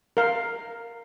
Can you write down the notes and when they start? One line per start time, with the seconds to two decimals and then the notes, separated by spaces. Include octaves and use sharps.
0.17 A#4 F5